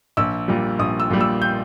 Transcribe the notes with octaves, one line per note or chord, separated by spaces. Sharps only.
A#1 E6
A#2 G3
A#1 D#6
E6
A#2 G3
E6
G6